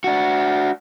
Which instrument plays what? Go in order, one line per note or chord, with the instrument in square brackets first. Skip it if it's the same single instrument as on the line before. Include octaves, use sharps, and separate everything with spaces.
[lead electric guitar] D4 F#4